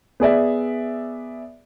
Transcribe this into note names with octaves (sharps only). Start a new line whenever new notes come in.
B3 G#4 D5 E5